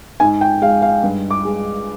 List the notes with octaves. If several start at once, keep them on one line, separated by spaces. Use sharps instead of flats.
G#2 G#5
G5
G#3 F5
F5
G2
D6
G#3